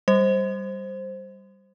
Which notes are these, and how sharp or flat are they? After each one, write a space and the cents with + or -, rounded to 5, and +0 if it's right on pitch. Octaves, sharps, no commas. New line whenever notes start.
G3 +0 C5 +5